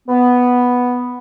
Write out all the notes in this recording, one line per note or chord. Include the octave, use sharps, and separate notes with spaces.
B3